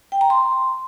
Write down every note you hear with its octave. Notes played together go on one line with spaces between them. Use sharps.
G5
A#5
C6